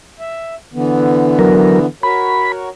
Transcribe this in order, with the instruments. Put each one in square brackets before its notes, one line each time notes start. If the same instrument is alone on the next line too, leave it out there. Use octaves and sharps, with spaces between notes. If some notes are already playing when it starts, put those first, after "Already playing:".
[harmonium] E5
D3 E3 B3
[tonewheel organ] F#3 A#4
[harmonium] F#4 A#4 C#5 [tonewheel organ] B5